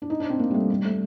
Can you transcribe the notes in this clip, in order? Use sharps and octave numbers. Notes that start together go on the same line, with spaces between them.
D4
D#4
D4
C4
A#3
G3
A3
G3
A3